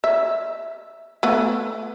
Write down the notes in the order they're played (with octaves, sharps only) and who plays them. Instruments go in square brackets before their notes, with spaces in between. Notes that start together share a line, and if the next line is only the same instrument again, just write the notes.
[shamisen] E5
A3 B3